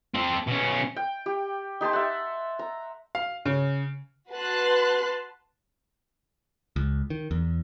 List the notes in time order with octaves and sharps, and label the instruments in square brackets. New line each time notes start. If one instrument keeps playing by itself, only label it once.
[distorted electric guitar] C4 A4
B2 C#4
[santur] G5
G4
D#4 G4 A5 C6
E5 F#5
A#5
[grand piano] F5
C#3
[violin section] F#4 B4 A5 C6 F#6
[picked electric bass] C#2
D#3
E2